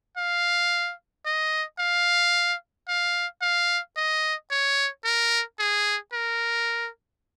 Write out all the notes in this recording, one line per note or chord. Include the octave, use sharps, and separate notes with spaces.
F5
D#5
F5
F5
F5
D#5
C#5
A#4
G#4
A#4